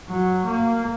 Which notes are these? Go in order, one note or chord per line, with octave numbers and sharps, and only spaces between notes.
F#3
A#3